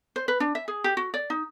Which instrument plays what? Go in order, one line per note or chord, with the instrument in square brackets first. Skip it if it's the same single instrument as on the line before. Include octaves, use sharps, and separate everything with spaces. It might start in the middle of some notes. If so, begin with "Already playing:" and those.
[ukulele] C5
B4
D4
E5
G#4
G4
F#4
D5
D#4